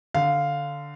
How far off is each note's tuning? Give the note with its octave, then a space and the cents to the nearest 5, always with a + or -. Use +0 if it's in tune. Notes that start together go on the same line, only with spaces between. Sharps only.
D3 +0 F5 +0